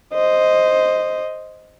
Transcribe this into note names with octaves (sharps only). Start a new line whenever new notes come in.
C5 D#5